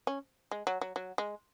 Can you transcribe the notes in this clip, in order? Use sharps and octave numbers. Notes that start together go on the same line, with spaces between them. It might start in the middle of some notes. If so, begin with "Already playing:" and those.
C#4
G#3
F#3
F#3
F#3
G#3